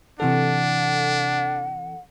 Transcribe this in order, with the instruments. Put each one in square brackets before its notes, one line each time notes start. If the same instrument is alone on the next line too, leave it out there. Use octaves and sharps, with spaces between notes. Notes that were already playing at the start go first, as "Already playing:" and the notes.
[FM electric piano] C3 E3 A4 [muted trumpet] D4 [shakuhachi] F#5